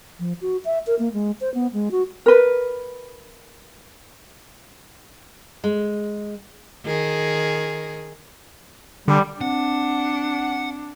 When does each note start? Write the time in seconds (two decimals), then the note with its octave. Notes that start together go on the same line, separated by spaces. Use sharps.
0.20 F3
0.42 F#4
0.65 E5
0.87 A#4
0.99 A#3
1.13 G#3
1.41 C5
1.54 B3
1.73 G#3
1.91 F#4
2.26 A#4 B4
5.64 G#3
6.85 D#3 G#4
9.08 D3 G3
9.41 C4 D4 F#5